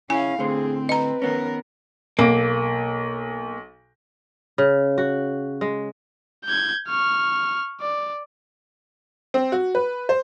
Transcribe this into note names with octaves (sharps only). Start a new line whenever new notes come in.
C#3 C#4 E4 F5 G#5
A2 D3 C4 G#4 C5
B4 D#5 A#5
D#3 B3 C#4 A#4
B1 A#3 D7
C#3
F#4
G#3
G6 G#6
C#6 F6
D5
C4
F#4
B4
C5